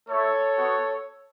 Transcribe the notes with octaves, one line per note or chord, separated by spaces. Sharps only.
A3 E4 A4 C#5
B3 F#4